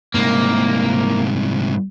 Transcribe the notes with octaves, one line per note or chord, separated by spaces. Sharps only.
C2 G#2 A#3